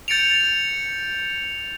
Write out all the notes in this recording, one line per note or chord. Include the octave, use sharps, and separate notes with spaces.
G6 A6 C#7 D7 F7